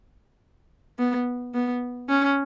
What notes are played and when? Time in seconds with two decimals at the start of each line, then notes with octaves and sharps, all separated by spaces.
0.99 B3
1.54 B3
2.09 C#4